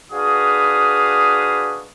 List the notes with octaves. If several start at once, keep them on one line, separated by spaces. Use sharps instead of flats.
D4 F#4 G#4 B4 F5 D#6